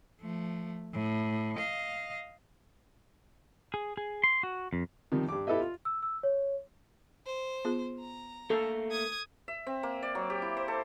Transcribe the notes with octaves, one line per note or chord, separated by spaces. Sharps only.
F3 A3
A2
D#5 F5
G#4
G#4
C6
F#4
F2
C3 D#3 F3 G3
G2 D6
E4 G4 A4 B4 D#5 E5
F4
E6
E6
C#5
C5
B3 F4 G#4
A#5
A3 A#3 A4 A#4
D#6 G#6
E5
C4
A#3
D5
F#3
G4
E4
C5
A4